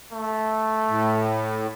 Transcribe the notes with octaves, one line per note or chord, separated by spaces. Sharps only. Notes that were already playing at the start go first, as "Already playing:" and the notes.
A3
A2